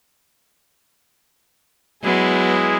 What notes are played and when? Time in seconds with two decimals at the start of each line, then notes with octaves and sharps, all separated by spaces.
2.03 F#3 G#3 B3 E4 G#4